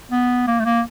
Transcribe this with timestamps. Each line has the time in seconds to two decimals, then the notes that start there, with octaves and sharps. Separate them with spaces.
0.11 B3
0.47 A#3
0.60 A3
0.65 A#3